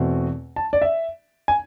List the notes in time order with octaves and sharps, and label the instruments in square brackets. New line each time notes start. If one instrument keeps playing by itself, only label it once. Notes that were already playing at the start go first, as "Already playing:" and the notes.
Already playing: [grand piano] E2 B2 A3 C4
A5
D5
E5
G#5